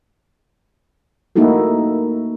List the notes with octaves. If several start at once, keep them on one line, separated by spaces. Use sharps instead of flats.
A3 A#3 D#4 E4 F#4 A4